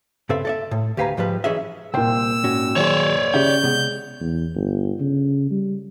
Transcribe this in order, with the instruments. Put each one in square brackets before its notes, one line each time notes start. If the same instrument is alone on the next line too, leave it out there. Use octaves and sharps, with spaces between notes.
[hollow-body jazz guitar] G2 C#3 C4 A4 B4 E5
A4 D5 E5
A2
D2 G4 B4 F5 G#5 A#5
G#2 F3 G3 B4
B1 E3 C#4 G#4 D#5 E5
[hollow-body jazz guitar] C2 C5 [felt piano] A#2 G5 [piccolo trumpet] E6
[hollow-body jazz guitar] G#2 C#4 F#4
[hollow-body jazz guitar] D#3 F#3 G#4 [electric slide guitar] C#5 D5
[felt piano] C#3 [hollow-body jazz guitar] G4 E5 F#5 [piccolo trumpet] G6
[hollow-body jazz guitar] C3 B3 [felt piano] G#3
[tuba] E2
G1
C#3
G3